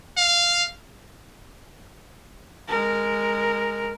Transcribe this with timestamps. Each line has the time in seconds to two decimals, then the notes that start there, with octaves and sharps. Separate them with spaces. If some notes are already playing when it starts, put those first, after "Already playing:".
0.17 F5
2.69 G#3 A#4